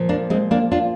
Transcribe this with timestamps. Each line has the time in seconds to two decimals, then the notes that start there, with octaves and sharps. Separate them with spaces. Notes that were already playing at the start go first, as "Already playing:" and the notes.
Already playing: A#2 F3
0.09 A#3 D4
0.30 G#3 C4
0.51 A#3 D4
0.72 D4 F4